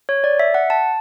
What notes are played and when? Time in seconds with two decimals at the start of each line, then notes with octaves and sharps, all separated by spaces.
0.09 C#5
0.24 D5
0.39 E5
0.54 F#5
0.70 A5